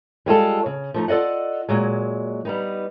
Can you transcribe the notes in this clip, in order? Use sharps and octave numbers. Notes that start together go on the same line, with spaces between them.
G3 G#3 F4 A4
C#3
F3 A3 D#4
F4 A4 D5 D#5 F#5
A#2 F#3 G#3
G3 B3 D#4